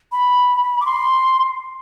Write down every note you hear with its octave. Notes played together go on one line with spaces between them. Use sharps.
B5
D6
C6